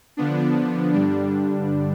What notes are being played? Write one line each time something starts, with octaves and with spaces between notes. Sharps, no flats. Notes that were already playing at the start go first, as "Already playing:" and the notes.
D3 F3 B3 D4
G2 D3 G3 D4